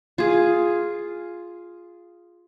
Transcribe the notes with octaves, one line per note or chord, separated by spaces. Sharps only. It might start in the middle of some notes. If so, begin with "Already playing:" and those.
F4 G#4